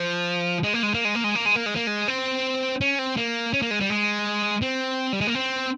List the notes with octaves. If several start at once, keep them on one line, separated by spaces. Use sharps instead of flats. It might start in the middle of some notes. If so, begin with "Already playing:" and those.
Already playing: F3
G#3
A#3
G#3
A#3
G#3
A#3
G#3
A#3
G#3
A#3
G#3
A#3
G#3
C4
C#4
C4
A#3
C#4
A#3
G#3
G3
G#3
C4
G3
G#3
A#3
C4